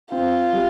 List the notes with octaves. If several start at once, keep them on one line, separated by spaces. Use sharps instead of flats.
C4 F4
G3